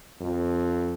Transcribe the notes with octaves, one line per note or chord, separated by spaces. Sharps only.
F2